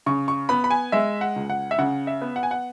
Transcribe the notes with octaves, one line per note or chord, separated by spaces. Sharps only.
C#3 C#6
C#6
B3 B5
B5
G#5
G#3 E5
F#5
C#2
F#5
E5
C#3 F#5
E5
B3
F#5
G#5
F#5